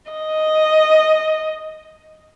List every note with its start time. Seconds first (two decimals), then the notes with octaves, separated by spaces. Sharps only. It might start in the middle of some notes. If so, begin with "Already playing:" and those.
0.12 D#5